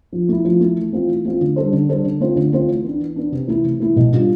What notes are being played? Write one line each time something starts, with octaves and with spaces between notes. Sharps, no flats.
F3
A3 E4
F3
A3 E4
E3
A3 C4 F4
E3
A3 C4 F4
D3
G3 D4 A4 C5
D3
G3 D4 A4 C5
D3
A3 C4 F4 C5
D3
A3 C4 F4 C5
E3
B3 D4
E3
B3 D4
C3
E3 A3 E4
C3
E3 A3 E4
B2
G3 D4 F4